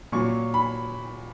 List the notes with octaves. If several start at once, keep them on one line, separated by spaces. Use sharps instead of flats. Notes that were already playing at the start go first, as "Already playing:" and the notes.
A#2 F#3 C#6
B5